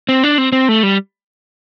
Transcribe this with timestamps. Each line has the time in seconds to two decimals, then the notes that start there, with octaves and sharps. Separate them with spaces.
0.09 C4
0.23 D4
0.38 C4
0.52 C4
0.69 A3
0.83 G3